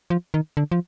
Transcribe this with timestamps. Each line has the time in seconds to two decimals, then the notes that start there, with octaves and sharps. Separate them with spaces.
0.10 F3
0.34 D#3
0.57 D3
0.72 F3